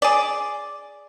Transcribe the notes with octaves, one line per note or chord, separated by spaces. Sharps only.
G#4 D5